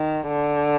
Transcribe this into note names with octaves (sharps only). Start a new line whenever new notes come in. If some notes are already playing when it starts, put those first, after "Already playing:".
Already playing: D#3
D3